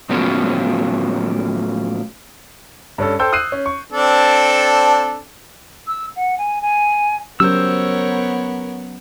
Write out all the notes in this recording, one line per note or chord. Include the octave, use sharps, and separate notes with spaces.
A2 F3 F#3 A#3 B3 C#4
G2 C#4 A4
A4 C5 G5 C6 E6 G6
D#6 E6 F#6 C7 D#7
C#4
C#6
C4 D4 A4
E6
F#5
G#5
G#5
F#3 B3 C#4 G4 A#4 C5 C#5 E6